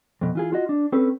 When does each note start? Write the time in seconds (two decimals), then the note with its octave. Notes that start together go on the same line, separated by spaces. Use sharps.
0.21 F2 B2
0.35 E3 F4 G#4
0.52 F4 F#4 D#5
0.69 D4
0.92 C4 C#4 A4 B4